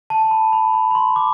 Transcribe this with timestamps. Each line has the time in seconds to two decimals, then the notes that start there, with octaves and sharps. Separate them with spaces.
0.10 A5
0.31 B5
0.53 B5
0.73 B5
0.91 B5
0.95 C6
1.16 D6